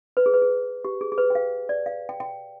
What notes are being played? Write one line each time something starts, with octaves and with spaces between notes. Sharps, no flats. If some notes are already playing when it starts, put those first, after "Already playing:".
B4
G#4
B4
G#4
G4
G#4
G#4
B4
G5
F5
D5
F5
G5
G5